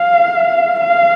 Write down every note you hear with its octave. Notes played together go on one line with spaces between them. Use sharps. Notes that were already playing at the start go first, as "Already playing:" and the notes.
Already playing: F5
F5